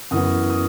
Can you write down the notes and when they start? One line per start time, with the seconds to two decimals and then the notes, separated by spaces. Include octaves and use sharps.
0.11 F#2 E3 B3 D#6
0.50 D#6